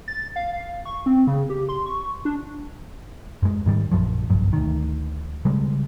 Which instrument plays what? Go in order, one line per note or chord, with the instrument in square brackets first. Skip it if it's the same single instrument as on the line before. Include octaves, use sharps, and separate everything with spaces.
[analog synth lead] A6
F5
F5
C#6
C4
C#3
G4
C6
C#6
D4
[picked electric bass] F#2 G#3
G#2 D#3 G3
A#1 F#2 F3 F#3
F#1 B1 G2
D2 D#3
C#3 G3 G#3